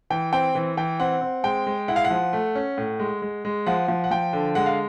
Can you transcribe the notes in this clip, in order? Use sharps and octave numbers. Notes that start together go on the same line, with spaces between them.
E3 G5
C4 G5
E3
E3 G5
C4 F#5
C4
G#3 G5
G#3
E4 F#5
F5
F#5
F3
A3
C#4
A2
G#3
G#3
G#3
F3 F#5
F3
F#5
F3 G5
D3
G#3 F#5
F5